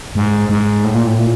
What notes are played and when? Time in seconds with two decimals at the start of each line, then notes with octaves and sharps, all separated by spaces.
0.15 G#2
0.49 G#2
0.84 A2
0.94 A#2
1.07 A2
1.19 A#2